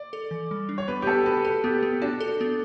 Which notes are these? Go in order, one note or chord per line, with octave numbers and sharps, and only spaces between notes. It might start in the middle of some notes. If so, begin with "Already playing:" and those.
Already playing: D5
A4
E3
G3
D4
C#5
B3 B4
G4
B3 A4
F#4 B4
A4 B4
B3 G4
B3
D4 F#4
A4
B3